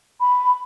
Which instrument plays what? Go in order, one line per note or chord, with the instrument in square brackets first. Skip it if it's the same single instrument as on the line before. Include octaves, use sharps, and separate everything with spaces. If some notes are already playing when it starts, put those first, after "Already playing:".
[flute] B5